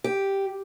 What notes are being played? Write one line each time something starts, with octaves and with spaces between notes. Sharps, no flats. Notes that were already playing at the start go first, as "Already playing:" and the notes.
G4